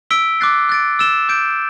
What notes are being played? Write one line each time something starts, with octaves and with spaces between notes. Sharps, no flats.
E6 B6 D7 G7
D6 F#6 A6 C7
F#6 A6 D7
E6 A6 E7 G7
D6 G6 D7